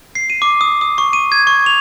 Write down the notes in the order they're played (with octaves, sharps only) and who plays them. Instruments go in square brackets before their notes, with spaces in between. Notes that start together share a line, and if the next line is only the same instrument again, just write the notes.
[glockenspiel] C7
D#7
D6
D#6
D#6
C#6
D#7
G#6
C#6
F7